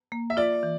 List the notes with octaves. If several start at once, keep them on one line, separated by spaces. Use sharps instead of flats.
A#3
E5
F4 D5
E3